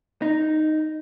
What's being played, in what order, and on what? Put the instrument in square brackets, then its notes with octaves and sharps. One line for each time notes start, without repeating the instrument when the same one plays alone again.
[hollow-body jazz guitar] D#4